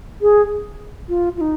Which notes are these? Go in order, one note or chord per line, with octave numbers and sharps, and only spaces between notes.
G#4
F4
F4
D#4